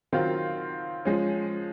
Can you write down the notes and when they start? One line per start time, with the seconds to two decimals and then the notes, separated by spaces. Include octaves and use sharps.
0.12 D#3 F#3 C4 F4
1.05 F3 G#3 C#4